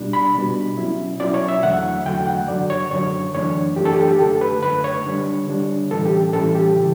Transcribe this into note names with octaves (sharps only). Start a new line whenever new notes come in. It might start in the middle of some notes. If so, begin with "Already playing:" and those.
Already playing: B2 G3 D4
B5
B2 G3 D4
B2 F#3 C#4 E4
B2 F#3 C#4 E4 D5
C#5
E5
E2 D3 F#3 A3 F#5
E2 D3 F#3 A3 G5
F#5
F#2 D3 F#3 D5
C#5
F#2 D3 F#3 C#5
F#2 E3 A3 D4 C#5
F#2 E3 A3 D4 G4
A4
G4
A4
G4
F#2 D3 A3 A4
B4
F#2 D3 A3 B4
C#5
D3 G3 D4
D3 G3 D4
A2 E3 G3 C#4 A4
G4
A2 E3 G3 C#4 A4
G4
C#3 E3